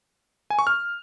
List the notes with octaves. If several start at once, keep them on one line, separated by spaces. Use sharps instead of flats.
G#5
C#6
F6